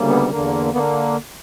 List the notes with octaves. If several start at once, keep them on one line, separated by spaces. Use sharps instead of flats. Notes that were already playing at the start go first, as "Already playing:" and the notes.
Already playing: D2 C#3 G3 A#3
B3
E2 D3 A#3
D3 A#3 B3